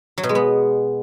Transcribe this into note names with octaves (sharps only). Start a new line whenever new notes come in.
F#3
B2
G#3
B3